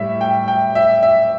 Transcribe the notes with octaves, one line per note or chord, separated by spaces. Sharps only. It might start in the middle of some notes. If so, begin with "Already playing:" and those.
Already playing: A2 G3 E5
G5
G5
E5
E5